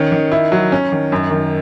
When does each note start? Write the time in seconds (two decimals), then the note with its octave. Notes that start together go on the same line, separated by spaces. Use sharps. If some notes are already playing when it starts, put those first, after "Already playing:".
Already playing: D#3 C#4
0.12 D#3
0.32 E4
0.52 F#3
0.72 C#4
0.92 D#3
1.12 F#2
1.31 D#3